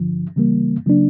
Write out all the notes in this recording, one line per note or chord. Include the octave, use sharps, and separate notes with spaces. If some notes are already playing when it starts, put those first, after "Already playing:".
Already playing: G2 D3 F3
C#2 C#3 E3 G3 A#3
C#3 F#3 A#3 D4